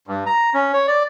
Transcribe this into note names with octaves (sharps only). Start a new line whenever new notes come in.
G2
A#5
C#4
C#5
D5